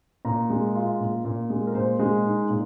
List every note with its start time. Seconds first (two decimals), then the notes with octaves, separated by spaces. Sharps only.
0.25 A#2 A#5
0.50 G#3
0.75 F4
1.00 A#2
1.25 A#2
1.50 G#3
1.67 A#4
1.74 A#2 C5
1.99 G#3
2.24 D#4
2.50 A#2